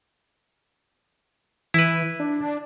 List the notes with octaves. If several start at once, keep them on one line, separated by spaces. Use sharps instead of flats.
E3 E4 B4
D4